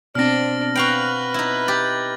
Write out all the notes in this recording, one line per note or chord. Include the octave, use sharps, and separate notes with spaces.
B2 C4 D4 F6 A#6
F#4 B4 F5 G5 F#6 F#7
D#4 E4
G4 A6